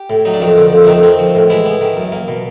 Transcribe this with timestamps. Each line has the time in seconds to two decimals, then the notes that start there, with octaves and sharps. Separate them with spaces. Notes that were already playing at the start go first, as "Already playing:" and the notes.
Already playing: G4
0.10 A2
0.25 F#3 D#4
0.34 D4
0.41 F2 D#3 D#4
0.57 D3
0.73 F2
0.84 E4
0.87 D#3 A3 D#4
1.03 C4
1.19 F3
1.35 A2
1.50 E3 G#3 E4
1.66 B3
1.81 D#3
1.97 F#2
2.12 A#3
2.28 B2